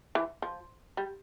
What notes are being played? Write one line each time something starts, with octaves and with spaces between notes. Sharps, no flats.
E3
F3
G3